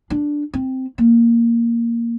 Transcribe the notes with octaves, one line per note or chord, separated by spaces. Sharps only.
D4
C4
A#3